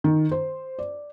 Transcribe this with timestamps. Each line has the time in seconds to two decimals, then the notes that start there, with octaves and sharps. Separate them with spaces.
0.04 D#3
0.31 C5
0.79 D5